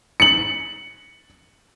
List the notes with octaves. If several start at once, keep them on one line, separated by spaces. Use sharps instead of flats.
C#7 F#7